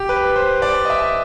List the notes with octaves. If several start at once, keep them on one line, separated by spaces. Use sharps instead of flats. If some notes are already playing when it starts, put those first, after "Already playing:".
Already playing: G4
B4
C5
D5
D#5
E5